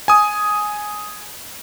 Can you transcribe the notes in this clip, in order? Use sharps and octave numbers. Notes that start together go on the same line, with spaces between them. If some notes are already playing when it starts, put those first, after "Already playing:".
G#5 D#6